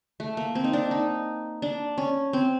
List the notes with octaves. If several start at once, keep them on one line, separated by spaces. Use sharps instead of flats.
A3
A#3
C4
D#4
D4
D#4
D4
C#4
C4